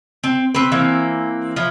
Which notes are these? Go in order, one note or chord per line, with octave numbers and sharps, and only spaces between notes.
C4
C4 B4
E3 A#3 C4
F3 E4